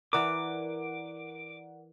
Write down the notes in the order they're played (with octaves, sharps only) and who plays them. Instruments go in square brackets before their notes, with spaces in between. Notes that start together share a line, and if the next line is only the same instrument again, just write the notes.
[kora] E3 B4 [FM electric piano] A#4 D5 F#5 [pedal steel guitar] D6